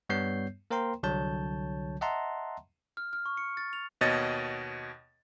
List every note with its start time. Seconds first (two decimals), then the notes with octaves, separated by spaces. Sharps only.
0.09 G2 G3 B3 C#5 G6 C7
0.71 A#3 A#4 C5 G5 A#5 C6
1.03 C2 D3 F#3 C#5 A5 G6
2.01 D#5 E5 F#5 A5 A#5 C6
2.97 F6
3.13 F6
3.26 C#6
3.37 C#7
3.57 A6
3.73 F7
4.01 D#2 B2 C#5 D#5 A6